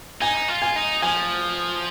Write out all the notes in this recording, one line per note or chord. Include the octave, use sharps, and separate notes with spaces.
D#4 G#5
F4
G#5
D#4
F3 G#5